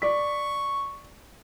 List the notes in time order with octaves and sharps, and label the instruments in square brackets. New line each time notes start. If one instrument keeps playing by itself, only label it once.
[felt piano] D5 B6 [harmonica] C#6